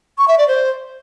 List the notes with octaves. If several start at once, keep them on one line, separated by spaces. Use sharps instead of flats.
C#6
E5
D5
C5